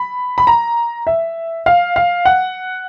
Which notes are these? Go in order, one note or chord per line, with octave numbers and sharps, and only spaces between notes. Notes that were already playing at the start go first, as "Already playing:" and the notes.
Already playing: B5
B5
A#5
E5
F5
F5
F#5